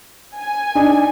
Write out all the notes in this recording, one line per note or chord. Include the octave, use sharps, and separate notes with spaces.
G#5
D4 D#4